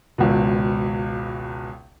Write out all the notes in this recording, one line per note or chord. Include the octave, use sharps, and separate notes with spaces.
G#1 C#2 B2